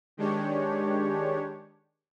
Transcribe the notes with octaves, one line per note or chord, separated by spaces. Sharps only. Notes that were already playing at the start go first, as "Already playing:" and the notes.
D#3 G#3 D4 G4 C#5